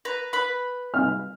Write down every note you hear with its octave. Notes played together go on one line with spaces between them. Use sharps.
B4 A#5
B4 B5
F6